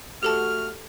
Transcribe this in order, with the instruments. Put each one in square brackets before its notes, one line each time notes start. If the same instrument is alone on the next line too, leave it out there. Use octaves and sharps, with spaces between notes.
[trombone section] A3 F#4 [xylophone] G4 A4 A5 [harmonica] F6